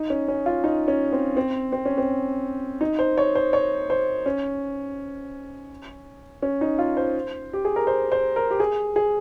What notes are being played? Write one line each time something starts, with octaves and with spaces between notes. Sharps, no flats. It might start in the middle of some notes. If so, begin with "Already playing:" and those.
Already playing: D#4
C#4
C#4
F4
D#4
C#4
C4
C4
C4
C#4
C4
D#4
C5
C#5
C5
C#5
C5
C#4
C#4
D#4
F4
C5
G4
G#4
A#4
C5
C5
A#4
G4
G#4
G#4